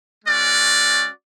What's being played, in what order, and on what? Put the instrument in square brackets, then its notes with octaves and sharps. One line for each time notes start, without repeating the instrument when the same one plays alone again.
[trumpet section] G#3 C#4 F#4 D5